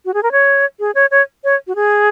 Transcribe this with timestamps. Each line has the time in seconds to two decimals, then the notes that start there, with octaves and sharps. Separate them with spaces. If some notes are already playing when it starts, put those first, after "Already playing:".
0.05 F#4
0.14 G#4
0.23 A#4
0.32 C#5
0.80 G#4
0.95 C#5
1.11 C#5
1.44 C#5
1.67 F#4
1.75 G#4